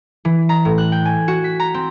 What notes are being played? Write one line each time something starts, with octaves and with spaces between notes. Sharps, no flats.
E3
A#5
A2
F#6
G5
G#5
F#4
B6
A#5
C4